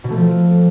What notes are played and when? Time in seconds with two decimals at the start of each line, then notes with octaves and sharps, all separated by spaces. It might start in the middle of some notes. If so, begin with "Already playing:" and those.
0.04 B2
0.10 A3
0.17 F3